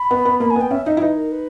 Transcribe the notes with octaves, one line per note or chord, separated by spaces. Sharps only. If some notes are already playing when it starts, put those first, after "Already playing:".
Already playing: B5
B3
B3
A#3 B5
G#5
B3
G5
C#4 E5
D#4 E5
E4
D#4 B4
A#4
B4